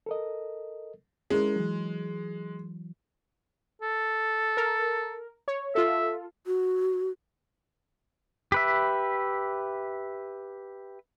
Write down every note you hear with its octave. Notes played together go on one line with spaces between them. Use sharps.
A4 A#4 D#5
G#3 C#4 E4 A#4
E3 F#3
A4
A#4
C#5
F4 A4 E5
F#4
G4 B4 E5